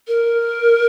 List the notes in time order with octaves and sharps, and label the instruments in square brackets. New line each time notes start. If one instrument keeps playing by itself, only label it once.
[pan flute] A#4